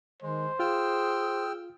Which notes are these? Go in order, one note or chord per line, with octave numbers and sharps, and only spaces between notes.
D#3 G#3 C5
F4 G#4 G5 E6 F6